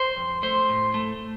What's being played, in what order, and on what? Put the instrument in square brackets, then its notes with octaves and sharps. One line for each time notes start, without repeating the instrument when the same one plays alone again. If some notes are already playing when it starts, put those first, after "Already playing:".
Already playing: [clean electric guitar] C5
F2
A3 C5
A2
A3